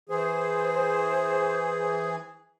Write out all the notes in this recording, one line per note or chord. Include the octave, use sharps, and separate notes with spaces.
E3 G#4 C5